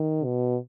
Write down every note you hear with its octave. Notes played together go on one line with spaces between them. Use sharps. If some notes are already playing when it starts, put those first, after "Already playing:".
Already playing: D#3
B2